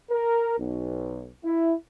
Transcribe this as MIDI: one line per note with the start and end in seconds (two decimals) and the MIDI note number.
0.10 0.55 70
0.58 1.28 35
1.44 1.73 64